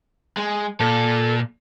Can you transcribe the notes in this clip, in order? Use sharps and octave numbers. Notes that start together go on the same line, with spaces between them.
G#3
A#2 A4